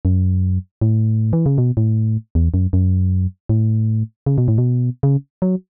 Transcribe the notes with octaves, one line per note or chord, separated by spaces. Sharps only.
F#2
A2
E3
C#3
B2
A2
E2
F#2
F#2
A2
C#3
B2
A2
B2
C#3
F#3